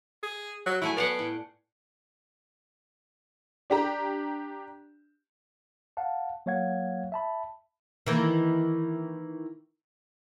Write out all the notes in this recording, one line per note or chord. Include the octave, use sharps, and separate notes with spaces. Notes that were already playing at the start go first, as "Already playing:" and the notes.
G#4
F#3
F#3 A3 E4 G#5
B3 D5 F5 F#5
A2
D4 G4 A#5
F5 F#5 A5
F#3 A#3 C#5 F5 F#5 G#6
E5 A5 B5
D#3 E3 A#3